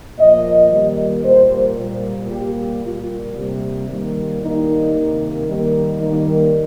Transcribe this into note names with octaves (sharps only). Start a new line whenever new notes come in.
A#2 F3 A#3 D#5
D#3 G3 A#3
A#2 G3 A#3 C5
A#2 G3 A#3
A#2 G3 A#3 G4
A#2 G3 A#3 F4
C3 G3 A#3
D#3 G3 A#3
D#3 G3 A#3 D#4
C3 D#3 A#3
D#3 G3 A#3
D#3 G3 A#3